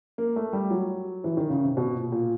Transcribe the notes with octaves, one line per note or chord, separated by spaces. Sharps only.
A#3
A3
G3
F#3
E3
D#3
C#3
C3
B2
A#2
A#2